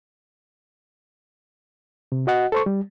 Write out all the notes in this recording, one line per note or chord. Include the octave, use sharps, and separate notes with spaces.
C3
F#4 D#5 F#5
A4 C5 C#6
G3